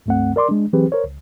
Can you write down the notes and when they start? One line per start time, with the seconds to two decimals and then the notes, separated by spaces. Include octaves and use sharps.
0.06 C#2 G2 A3 C4 F#5
0.36 A#4 D5 C6 D6
0.49 G#3 D4
0.73 E3 F#3 C4 G4 G#4 B4
0.92 A#4 C5 C#5
1.04 C#2